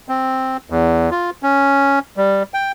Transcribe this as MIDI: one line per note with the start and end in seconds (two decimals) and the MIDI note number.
0.09 0.57 60
0.70 1.10 40
1.11 1.30 65
1.43 1.99 61
2.17 2.43 55
2.54 2.72 79